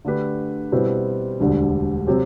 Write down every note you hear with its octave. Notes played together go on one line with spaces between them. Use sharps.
D3 A3 D4 G4 B4
B2 G3 C4 E4 B4
E1 D2 D3 G3
C3 F#3 C4 G4